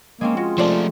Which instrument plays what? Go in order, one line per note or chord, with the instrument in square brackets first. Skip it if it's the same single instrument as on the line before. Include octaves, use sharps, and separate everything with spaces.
[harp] G#3 C4 C#4 [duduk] A#3
[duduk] F4 [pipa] F#4
[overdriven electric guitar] F3 A3 [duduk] F4 [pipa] C5 D5 A5